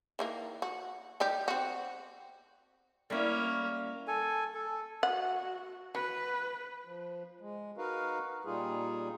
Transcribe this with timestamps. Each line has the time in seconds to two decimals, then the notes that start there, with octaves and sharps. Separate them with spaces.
0.19 D#3 E3 A#3
0.62 F#4
1.20 G3 D#4 G4
1.48 C4 F#4
3.10 G3 A#3 C#4 E4
4.07 A4 G#5
4.54 A4
5.03 F#4 F#5
5.95 F#4 B4
6.85 F3
7.41 G#3
7.78 D#4 F#4 A#4 B4 F5
8.45 A#2 G3 D#4 F4 G#4